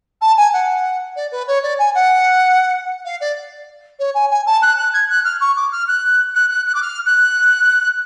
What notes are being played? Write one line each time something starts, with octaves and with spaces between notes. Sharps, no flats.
A5
G#5
F#5
D5
B4
C#5
D5
G#5
F#5
F5
D5
C#5
G#5
G#5
A5
F#6
F#6
G#6
F#6
F6
C#6
D6
F6
F#6
F#6
F#6
F#6
D6
F6
F#6